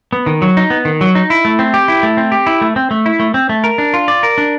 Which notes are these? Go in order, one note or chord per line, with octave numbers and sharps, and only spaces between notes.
B3
D#3
F#3
D#4
B3
D#3
F#3
D#4
E4
A3
C4
G4
E4
A3
C4
G4
E4
A3
C4
A3
E4
A3
C4
A3
A#4
D4
F4
D5
A#4
D4